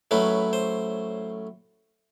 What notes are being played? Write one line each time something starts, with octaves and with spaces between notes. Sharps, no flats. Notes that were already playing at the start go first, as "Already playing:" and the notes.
A2 F#3 A3 C#4 B4
C5